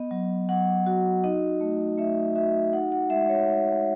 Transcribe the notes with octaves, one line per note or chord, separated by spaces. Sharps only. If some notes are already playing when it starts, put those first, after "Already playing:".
Already playing: B3 D#5
F#3
F#3 F#5
F#4
D#4 D#5
A3
A3 E5
F#4 E5
D#4 F#5
F#5
G#3 E5
C#5